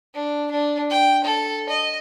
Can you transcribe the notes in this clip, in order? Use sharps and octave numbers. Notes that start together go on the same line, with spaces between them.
D4
D4
G5
A4
D#5